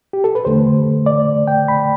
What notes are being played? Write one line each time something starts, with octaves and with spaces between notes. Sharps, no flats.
G4
A4
B4
E2 D3 A3 C5
D5
G5
B5